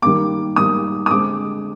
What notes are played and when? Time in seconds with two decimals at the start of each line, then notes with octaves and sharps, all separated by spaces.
0.02 D#3 G3 A#3 D6
0.56 D#3 G3 A#3 D#6
1.06 D#6
1.11 D3 G#3 C4 D6